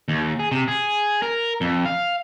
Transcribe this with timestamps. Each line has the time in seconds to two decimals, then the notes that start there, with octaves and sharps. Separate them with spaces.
0.08 D#2
0.39 G#4
0.51 C3
0.68 G#4
1.22 A#4
1.61 F2
1.85 F5